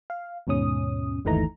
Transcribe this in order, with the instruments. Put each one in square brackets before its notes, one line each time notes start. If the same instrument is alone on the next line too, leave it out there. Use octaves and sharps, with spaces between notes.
[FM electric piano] F5
D#2 G#2 B2 C#4 D#6
G1 D#2 E3 A3 D#4 A#5